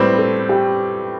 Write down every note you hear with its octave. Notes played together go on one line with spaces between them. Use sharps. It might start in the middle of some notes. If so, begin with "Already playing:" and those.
Already playing: A2 G3 C4 B4
A4
G4